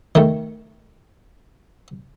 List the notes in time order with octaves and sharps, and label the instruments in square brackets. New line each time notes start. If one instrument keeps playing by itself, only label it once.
[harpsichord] D#3 A3